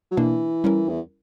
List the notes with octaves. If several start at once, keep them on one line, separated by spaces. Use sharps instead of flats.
F#3
B2 E3 A#3 D4
G3 C#4 E4 A#4
E2